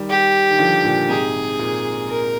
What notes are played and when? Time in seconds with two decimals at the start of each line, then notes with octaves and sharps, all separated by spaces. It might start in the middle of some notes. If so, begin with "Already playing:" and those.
Already playing: D#3 G3
0.10 G4
0.50 D#3
0.59 D3 F3
0.84 A#2 D3
1.09 G#2 C3 G#4
1.59 A#2
2.09 A#4